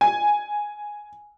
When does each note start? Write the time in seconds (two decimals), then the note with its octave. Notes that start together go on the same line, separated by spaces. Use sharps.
0.01 G#5